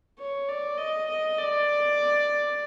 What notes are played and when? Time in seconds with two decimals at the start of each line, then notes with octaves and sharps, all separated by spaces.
0.19 C#5
0.48 D5
0.78 D#5
1.08 D#5
1.38 D5